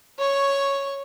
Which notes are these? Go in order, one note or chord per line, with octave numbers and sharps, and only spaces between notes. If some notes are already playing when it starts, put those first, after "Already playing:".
C#5 C#6